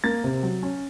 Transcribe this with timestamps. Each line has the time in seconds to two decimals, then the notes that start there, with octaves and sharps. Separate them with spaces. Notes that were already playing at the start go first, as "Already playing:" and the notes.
0.04 A#3 A6
0.24 C3
0.43 F#3
0.63 C#4